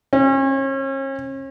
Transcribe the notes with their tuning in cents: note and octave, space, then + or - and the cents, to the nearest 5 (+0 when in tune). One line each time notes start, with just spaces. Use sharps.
C#4 -40